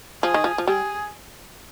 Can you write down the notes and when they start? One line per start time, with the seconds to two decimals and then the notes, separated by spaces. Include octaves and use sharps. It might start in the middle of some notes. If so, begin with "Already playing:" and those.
0.23 F3 G#4
0.34 D#3
0.44 F3
0.58 F3
0.67 G3 G#4